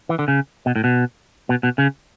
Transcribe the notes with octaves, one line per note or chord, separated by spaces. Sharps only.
E3
D3
C#3
B2
A2
B2
B2
B2
C#3